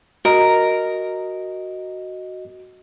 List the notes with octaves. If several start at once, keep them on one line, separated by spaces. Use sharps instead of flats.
F#4 A#4 D#5